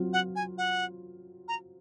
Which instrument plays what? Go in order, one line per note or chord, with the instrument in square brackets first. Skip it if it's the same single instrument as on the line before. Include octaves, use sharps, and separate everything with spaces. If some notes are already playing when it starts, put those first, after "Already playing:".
Already playing: [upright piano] F#3 C4 F4
[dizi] F#5
G#5
F#5
A#5